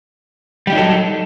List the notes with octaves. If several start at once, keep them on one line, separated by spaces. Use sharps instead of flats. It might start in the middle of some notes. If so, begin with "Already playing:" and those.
F#3 G3 D#4 G4 A4